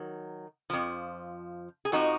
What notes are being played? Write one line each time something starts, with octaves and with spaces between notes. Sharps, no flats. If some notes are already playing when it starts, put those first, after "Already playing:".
Already playing: D#3 F#3
F2 F3
G#4
F2 F3 D#4 F#4